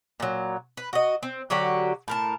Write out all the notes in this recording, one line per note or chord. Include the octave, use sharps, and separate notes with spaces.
A#2 F#3
B4
F#4 D#5
C4
D3 F#3 F#4 G4
A2 A#4 A5